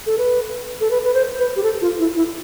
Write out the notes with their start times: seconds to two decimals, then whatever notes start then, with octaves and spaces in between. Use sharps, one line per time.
0.06 A4
0.18 B4
0.81 A4
0.91 B4
1.04 B4
1.14 C5
1.39 B4
1.56 G4
1.63 A4
1.81 F4
1.99 E4
2.16 E4